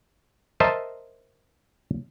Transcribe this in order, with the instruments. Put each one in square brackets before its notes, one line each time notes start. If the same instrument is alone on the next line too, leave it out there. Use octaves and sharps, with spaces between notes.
[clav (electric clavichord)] A#4 C5 D#5 E5 A5